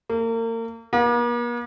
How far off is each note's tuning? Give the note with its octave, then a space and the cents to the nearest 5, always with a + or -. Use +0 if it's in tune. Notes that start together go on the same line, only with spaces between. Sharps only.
A#3 -35
A#3 +45